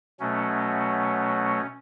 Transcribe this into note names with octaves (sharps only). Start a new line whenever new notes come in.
B2 F#3 A3 C#4